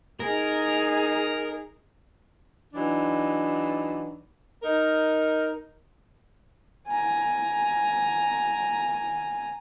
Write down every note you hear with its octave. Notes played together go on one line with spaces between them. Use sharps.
D#4 G#4 A#4
E3 F#3 D4 D#4
D#4 A#4
G#5 A#5